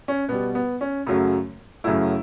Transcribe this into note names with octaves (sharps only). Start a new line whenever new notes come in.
C#4
B2 G3 B3
B3
C#4
F#2 C#3 F#3 A3
F#2 C#3 F#3 A3 E4